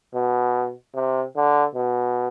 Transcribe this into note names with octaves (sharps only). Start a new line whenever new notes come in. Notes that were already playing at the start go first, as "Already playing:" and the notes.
B2
C3
D3
B2